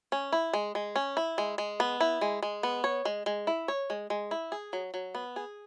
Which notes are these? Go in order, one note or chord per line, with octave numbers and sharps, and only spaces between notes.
C#4
E4
G#3
G#3
C#4
E4
G#3
G#3
B3
E4
G#3
G#3
B3
C#5
G#3
G#3
E4
C#5
G#3
G#3
E4
G#4
F#3
F#3
B3
G#4